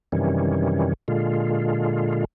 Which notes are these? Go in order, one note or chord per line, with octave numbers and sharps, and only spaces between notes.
F#2 C3 D#3 E3 G3 C#4
A#2 D3 G#3 F4